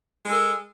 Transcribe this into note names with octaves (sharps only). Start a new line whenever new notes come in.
G#3 A4 A#4